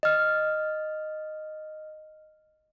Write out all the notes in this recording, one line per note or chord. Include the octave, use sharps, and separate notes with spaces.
D#5 F6